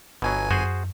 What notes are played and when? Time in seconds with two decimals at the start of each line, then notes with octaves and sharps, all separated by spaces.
0.22 G1 B2 F#3 G#5
0.50 F#2 F#4 G#4 C5